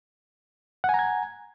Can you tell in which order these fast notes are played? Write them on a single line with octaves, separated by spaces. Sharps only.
F#5 G#5 A#5 G#6